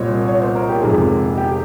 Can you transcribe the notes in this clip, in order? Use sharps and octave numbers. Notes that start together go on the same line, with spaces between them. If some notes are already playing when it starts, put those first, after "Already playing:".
Already playing: C2 A#2 G3 C4 C#5 D#5
C#5
C5
A#4
G4
F2 C3 D#3 G#3 G#4
G4